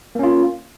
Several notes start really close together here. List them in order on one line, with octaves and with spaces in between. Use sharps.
A#3 C#4 F4